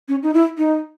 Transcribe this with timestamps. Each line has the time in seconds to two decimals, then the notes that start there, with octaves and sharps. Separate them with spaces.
0.08 C#4
0.23 D#4
0.34 E4
0.58 D#4